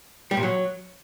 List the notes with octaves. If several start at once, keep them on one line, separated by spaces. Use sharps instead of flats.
G3
A#2
F#3